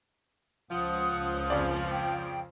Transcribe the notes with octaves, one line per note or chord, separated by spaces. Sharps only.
C#2 F3 F#5 D#6
F2 C#3 D5
G5